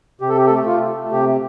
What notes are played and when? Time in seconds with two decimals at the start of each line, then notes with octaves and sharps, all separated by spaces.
0.21 C3 G4
0.29 A4
0.37 G4
0.46 A4
0.50 A3 G4
0.66 F4
0.81 A3
1.10 C3 G4